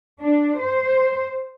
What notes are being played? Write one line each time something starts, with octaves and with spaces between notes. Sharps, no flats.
D4
C5